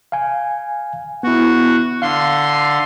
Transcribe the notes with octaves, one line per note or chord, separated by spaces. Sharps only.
F5 G#5
B3 E4 F#4
D3 F5 C6